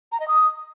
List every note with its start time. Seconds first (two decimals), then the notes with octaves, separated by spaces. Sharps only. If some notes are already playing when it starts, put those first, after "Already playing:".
0.12 A#5
0.20 D#5
0.28 D#6